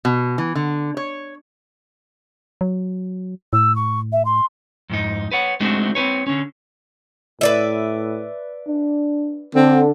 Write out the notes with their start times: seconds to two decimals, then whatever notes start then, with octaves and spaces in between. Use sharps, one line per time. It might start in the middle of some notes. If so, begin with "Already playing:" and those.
0.05 B2
0.38 E3
0.55 D3
0.97 C#5
2.61 F#3
3.53 A2 E6
3.76 C#6
4.12 E5
4.25 C6
4.90 F2 G#2 D#4
5.32 B4 C#5 F#5
5.60 G#3 A3 C4 D4 D#4 F#4
5.95 C4 C#4 B4 C#5
6.27 D3 C#4
7.41 A2 B4 D5 E5
8.68 D4
9.55 D3 C4